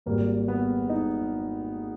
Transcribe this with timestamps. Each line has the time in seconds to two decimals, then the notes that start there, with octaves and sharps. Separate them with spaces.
0.06 G#1 G#2 G3 A#3
0.48 B3
0.90 D#4